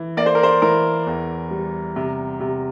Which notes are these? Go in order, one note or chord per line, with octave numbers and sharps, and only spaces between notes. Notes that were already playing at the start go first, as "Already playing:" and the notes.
Already playing: E3
A#3 D5
C5
A#4
C5
E3 A#4
E2
G3
C3
C3